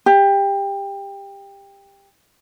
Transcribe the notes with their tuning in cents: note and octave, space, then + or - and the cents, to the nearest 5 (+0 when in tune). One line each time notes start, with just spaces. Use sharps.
G4 +20